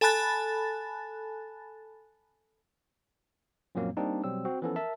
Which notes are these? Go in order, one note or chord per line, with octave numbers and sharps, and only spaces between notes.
A4 G#5 A5 B5 F#6 A6
F#2 A#2 F3 F#3 A#3 C4
G3 A#3 C4 D4 D#4
B2 F#3 G3 C4 E6
C4 F#4
E3 F3 B3 C#4 A4
A#4 E5 A5